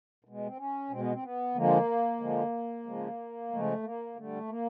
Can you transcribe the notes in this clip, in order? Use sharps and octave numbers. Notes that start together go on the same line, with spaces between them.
B2 G#3
C4
C#4
B2 G#3 C4
B3
C4
B3
D3 F3 G#3 A#3
D3 F3 G#3
C#3 F3 G#3
C#3 F3 G#3 A3
A#3
D3 G3 A3
A#3